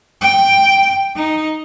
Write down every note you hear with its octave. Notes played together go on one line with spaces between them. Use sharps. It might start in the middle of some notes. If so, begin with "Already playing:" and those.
G5
D#4